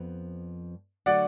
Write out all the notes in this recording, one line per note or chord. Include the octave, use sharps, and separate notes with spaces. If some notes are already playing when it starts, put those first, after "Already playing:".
Already playing: F2 F3 B3
D3 F#3 A3 D4 F#4 D5 F#5